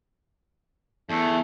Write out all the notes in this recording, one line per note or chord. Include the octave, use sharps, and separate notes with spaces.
E2 A3